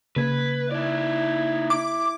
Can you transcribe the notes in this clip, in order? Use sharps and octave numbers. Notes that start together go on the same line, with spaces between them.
C#3 A#3 B4 G#6
D#4 E4 D5
D6